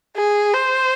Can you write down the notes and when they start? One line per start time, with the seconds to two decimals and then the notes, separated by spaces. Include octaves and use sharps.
0.16 G#4
0.54 C5